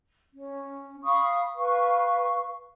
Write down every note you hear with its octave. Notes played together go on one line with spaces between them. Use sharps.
C#4
F5 B5 C#6 D#6
B4 F5 C#6